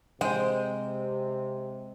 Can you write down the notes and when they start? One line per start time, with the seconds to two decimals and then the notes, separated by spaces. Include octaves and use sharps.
0.21 C3 G#3 C5 G5